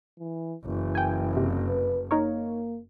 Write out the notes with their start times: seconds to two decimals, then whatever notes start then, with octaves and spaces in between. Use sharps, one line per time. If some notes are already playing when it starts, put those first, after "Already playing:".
0.19 E3
0.65 F#1 E3
0.95 G5 G#5
1.37 C3
1.69 B4
2.11 A#3 D#4 A#4 C#5